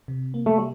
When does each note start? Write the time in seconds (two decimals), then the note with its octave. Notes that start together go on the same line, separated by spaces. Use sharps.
0.08 C3
0.34 A#3
0.46 A3
0.59 G3